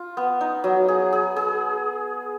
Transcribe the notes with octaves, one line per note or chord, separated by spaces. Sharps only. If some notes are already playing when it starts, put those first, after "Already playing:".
Already playing: F4
B3
D#4
F#3
G#4
G#4
G#4